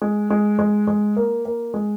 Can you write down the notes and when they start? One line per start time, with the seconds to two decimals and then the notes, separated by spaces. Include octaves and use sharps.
0.02 G#3
0.30 G#3
0.59 G#3
0.87 G#3
1.16 A#3
1.45 A#3
1.74 G#3